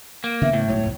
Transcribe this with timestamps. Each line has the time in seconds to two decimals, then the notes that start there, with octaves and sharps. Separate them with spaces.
0.24 A#3
0.41 C#3 E3 B3 E5
0.53 A2
0.68 B1 G#2 F#3 C#5
0.81 B1 F2 G#2